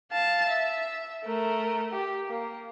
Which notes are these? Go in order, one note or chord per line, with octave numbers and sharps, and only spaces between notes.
F5 A5
E5
A3 A#4
G4
A#3